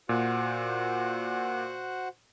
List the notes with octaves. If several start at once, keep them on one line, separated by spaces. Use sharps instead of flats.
A#2 F#4 C5 F#5